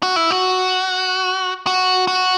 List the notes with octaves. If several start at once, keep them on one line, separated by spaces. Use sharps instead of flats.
F#4
E4
F#4
F#4
F#4